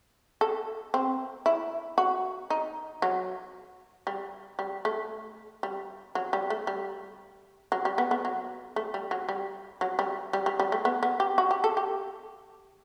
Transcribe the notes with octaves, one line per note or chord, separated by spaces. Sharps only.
A4
C4
E4
F#4
D#4
F#3
G3
G3
A3
G3
F#3
G3
A3
G3
F#3
G3
B3
B3
F#3
A3
G3
F#3
G3
F#3
G3
G3
G3
G3
A3
B3
B3
G4
F#4
G4
A4
G4